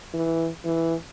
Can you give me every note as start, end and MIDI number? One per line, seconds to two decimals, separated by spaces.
0.14 0.48 52
0.64 0.94 52